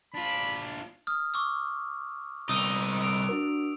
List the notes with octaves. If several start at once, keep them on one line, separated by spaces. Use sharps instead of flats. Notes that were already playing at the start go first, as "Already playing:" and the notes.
D4 F4 B5
D#6 F6
C#6 D6 E6
C2 D#4 D#6 E6
E6 D7 F7
D4 F#4 A#4